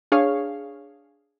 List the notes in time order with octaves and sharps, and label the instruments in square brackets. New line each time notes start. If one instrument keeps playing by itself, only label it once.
[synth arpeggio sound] D4 G#4 C#5 F5 C#6